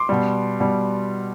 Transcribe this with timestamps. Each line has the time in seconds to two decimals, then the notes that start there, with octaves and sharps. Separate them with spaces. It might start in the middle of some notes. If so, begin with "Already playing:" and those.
Already playing: C6 D6
0.09 B2 G3
0.60 B2 G3